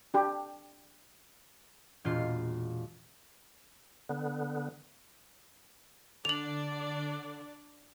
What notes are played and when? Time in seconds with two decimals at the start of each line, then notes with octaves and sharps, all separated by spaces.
0.14 D4 G4
2.05 E1 A#2 F4 C7
4.09 D3 B3
6.25 D3 D4 D5 F7 F#7